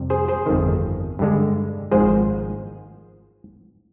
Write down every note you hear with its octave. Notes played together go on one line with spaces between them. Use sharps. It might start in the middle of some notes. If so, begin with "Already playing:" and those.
Already playing: F2 C3 G3
G#4 C5
G#4 C5
G1 F2 D#3
G2 D3 G#3
G#1 G#2 F3 G#3 G#4 C5